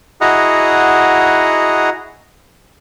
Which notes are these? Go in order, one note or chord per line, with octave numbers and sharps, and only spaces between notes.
E4 F#4 G#4 D#5 F#5 A#5